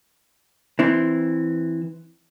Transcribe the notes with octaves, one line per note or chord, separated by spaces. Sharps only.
E3 C4 E4